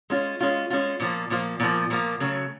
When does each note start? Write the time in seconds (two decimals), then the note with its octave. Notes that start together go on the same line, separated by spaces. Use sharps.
0.10 G#3 C#4 F4
0.41 G#3 C#4 F4
0.70 G#3 C#4 F4
1.00 A#2 F3 A#3
1.30 A#2 F3 A#3
1.60 A#2 F3 A#3
1.90 A#2 F3 A#3
2.20 C#3 F#3 A3